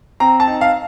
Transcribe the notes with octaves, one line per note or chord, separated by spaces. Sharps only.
C4 A#5
A5
D#4
F5